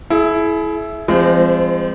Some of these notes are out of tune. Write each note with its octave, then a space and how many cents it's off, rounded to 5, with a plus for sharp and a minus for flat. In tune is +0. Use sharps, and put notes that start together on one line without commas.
E4 +0 G#4 +40
F3 -35 G#3 -35 C4 +0